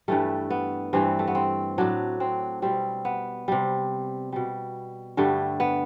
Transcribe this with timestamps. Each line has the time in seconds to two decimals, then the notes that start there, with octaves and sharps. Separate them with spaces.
0.08 G2 E3 G3 A3
0.50 B3
0.93 G2 E3 G3 C4
1.19 A3
1.27 B3
1.35 C4
1.78 A2 F#3 D4
2.20 C4
2.62 B2 G3 C4
3.05 B3
3.48 C3 G3
4.32 B2 G3
5.17 G2 D3 G3 A3
5.60 B3